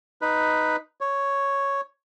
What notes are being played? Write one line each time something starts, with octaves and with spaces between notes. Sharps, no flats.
D#4 B4
C#5